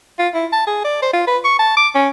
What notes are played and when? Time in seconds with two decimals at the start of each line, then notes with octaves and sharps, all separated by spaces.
0.19 F4
0.34 E4
0.53 A5
0.67 G#4
0.84 D5
1.02 C5
1.13 F4
1.27 B4
1.45 C#6
1.59 A5
1.77 D6
1.95 C#4